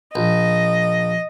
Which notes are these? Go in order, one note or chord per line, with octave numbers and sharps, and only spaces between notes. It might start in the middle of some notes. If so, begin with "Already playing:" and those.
A#1 D#5